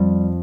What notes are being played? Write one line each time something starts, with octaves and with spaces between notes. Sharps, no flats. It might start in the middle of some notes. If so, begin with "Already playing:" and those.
Already playing: F2 F3 G3